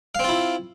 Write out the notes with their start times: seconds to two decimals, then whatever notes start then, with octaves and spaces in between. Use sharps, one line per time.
0.15 F5
0.19 C4
0.24 F4
0.29 E4